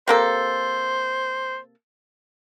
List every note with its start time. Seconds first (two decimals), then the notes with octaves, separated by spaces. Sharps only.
0.08 C3 A#3 A4 C5